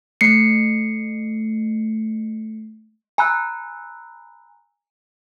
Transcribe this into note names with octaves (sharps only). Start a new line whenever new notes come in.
A3 C7 C#7
G#5 A#5 B5 E6 F#6